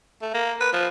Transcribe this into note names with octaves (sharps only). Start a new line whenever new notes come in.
A3
A#3
B4
F3